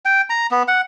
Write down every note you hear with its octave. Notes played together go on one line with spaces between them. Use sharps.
G5
A#5
B3
F#5